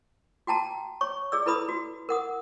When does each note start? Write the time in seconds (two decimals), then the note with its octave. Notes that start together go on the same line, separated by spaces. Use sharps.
0.47 F#4 G5 A5 A#5
1.01 C#5 C#6
1.32 G#4 D5 E6
1.46 E4 A4 B4 B5 D#6
1.69 F#4
2.09 A#4 F#5 D#6